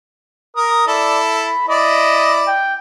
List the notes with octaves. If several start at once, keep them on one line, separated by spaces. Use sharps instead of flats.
A#4 D#6
E4 A4 D5
B5
E4 D5 D#5
G5